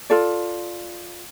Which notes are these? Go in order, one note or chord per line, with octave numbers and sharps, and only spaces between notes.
F4 A4 D5